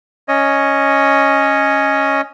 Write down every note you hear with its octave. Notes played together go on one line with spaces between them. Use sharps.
C#4 C#5 D#5